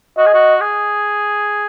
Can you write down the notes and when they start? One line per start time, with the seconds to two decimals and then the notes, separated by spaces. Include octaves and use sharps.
0.18 F#4 D#5
0.26 G#4
0.34 F#4
0.61 G#4